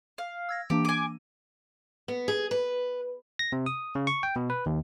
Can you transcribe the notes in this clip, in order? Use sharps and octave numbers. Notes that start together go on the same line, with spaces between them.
F5
E6 G#6 A#6
E3 A#3 D4 G4
G#5 D6 D#7
B3
G#4
B4
A#6
C3
D#6
C#3
C#6
G5
B2
B4
D#2